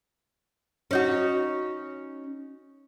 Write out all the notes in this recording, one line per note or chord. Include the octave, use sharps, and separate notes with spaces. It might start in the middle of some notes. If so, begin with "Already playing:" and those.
C#4 D#4 F#4